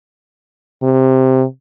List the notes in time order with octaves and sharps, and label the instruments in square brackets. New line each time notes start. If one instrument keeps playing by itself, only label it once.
[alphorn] C3